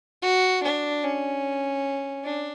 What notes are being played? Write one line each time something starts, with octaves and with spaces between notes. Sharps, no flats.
F#4
D4
C#4
D4